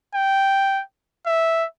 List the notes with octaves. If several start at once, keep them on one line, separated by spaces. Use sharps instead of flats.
G5
E5